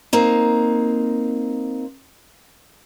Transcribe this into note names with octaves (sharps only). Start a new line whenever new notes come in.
A#3 C4 D#4